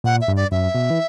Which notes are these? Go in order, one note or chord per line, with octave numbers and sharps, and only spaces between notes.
A#2 F#5
E5
G2
D5
F#2 E5
B2
E3